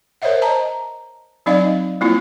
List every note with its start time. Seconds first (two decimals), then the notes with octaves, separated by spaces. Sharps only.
0.22 A#4 C5 C#5 D#5 E5 F#5
0.42 C5 D#5 A5 A#5
1.46 F#3 C4 D#4 D5 D#5 F5
2.01 G3 A#3 C4 E4 F4